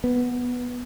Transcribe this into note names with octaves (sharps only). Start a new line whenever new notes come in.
B3